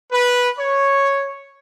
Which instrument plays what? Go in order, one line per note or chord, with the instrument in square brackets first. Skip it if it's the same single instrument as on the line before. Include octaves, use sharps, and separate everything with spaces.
[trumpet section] B4
C#5